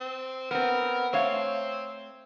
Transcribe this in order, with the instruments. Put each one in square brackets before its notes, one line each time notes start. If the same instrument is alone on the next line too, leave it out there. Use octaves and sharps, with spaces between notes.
[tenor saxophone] C4
[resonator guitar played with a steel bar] B3 C4 [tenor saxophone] A#4
[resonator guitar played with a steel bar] A3 C#5 F5 [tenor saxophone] C4